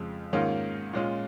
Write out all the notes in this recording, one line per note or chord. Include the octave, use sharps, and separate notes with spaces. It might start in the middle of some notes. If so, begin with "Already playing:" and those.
Already playing: F2 C#3 F3 G#3
G#2 D#3 A#3 C#4 F4
A#2 G#3 C#4 F4